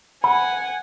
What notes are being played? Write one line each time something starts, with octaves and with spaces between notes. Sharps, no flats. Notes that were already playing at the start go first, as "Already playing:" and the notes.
F#5 G#5 B5